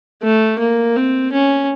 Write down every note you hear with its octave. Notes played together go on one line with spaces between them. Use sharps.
A3
A#3
C4
C#4